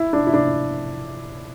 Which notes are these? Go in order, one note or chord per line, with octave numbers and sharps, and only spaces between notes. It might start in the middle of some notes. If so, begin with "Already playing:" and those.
Already playing: E4
D4
E4
D4